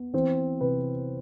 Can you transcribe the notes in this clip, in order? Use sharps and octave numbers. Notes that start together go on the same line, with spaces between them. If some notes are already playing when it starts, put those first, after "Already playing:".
Already playing: B3
E3 C4 C5
C3 B4